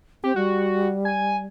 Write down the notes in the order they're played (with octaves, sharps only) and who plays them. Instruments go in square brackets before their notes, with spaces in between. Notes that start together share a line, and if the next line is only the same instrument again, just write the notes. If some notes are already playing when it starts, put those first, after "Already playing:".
[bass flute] C4 [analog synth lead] G4
[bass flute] G3 [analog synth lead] F#4
[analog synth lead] G#5